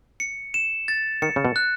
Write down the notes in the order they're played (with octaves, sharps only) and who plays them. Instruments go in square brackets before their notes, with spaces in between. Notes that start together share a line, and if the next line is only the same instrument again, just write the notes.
[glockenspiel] C#7
E7
A6
[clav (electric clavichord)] D#3 [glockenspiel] C#7
[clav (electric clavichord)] C#3
B2
[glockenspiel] F#6